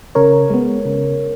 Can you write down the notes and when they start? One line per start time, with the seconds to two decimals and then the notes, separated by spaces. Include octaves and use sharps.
0.15 C#3 A#4 C#5
0.50 G#3 B3
0.85 C#3